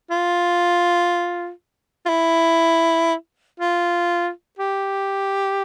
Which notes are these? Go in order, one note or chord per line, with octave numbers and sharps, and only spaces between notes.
F4
F4
E4
F4
G4